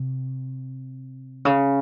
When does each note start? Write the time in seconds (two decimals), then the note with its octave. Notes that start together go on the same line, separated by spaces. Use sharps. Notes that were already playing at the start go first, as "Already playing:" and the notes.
Already playing: C3
1.45 C#3